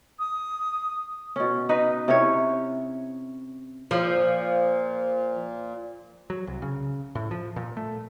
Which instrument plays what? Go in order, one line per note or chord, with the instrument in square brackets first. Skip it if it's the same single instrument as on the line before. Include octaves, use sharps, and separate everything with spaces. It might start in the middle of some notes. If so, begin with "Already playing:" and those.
[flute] D#6
[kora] B2 C#4
D#4 B4 D#5
C3 C#4 E4 C#5
[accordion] A#2 [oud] F3
[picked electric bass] F#3
C2
C#3
A2
F3
A#2
A3